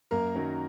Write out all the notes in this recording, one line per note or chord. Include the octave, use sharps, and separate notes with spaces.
F#2 A#3 A#4
D#3 F#3 A#3 C#4